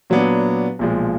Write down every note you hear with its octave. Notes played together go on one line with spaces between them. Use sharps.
A#2 F#3 B3 D4
B1 A#2 F3 G#3